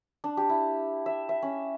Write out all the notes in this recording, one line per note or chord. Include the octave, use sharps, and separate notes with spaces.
D4
G4
E4
E5
E5
C#4